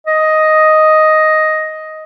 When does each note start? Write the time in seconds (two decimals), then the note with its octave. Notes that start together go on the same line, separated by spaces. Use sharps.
0.07 D#5